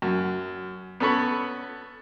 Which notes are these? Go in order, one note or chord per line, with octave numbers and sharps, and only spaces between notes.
F#2
B3 C#4 A4 B5 C#6